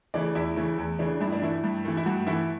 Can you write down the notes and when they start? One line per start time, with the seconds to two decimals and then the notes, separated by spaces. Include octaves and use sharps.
0.14 C#3 E3 A3 D5
0.35 E2 E4
0.56 C#3 E3 A3
0.78 E2
0.99 C#3 E3 A3 D4
1.21 G2 E4
1.32 D4
1.42 E3 A3 E4
1.64 G2
1.85 E3 A3
1.97 E4
2.06 G2 F#4
2.27 E3 A3 E4